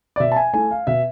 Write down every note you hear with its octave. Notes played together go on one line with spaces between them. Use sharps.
D5
B2 E5
A5
G#5
A3 E4 G#5
F5
B2 E5